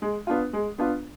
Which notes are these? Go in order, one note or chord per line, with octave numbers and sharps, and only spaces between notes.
G#3
B3 D4 F4
G#3
B3 D4 F4